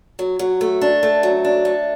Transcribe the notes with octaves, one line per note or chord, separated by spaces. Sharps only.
F#3
F#3
A3
D4
A3
F#3
D4
A3